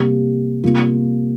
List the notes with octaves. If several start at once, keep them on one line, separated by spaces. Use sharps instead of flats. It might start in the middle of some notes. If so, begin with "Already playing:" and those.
Already playing: C3 G3 A#3
C3 G3 A#3 F4